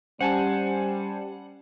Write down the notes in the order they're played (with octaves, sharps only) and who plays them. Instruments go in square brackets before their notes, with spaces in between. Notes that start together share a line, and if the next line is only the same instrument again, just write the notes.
[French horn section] G3 [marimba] C#4 [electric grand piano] C5 G#5 A5 [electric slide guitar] F#5